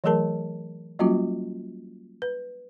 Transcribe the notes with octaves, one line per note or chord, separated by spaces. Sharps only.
E3 F#3 A3 G#4 A#4 A5
F#3 G3 A#3 C#4 F4 F#4
B4